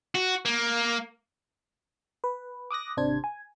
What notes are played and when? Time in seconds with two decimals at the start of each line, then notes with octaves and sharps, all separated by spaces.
0.15 F#4
0.45 A#3
2.24 B4
2.71 D6 D#6 F#6 A#6
2.97 G#1 C3 D4 C5 G#6
3.24 G#5